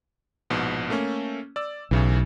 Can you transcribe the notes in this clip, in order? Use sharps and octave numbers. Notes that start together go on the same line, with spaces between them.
A#1 G#2 B2
A3 A#3 C#4
D5 E6
B1 A2 C#3 E3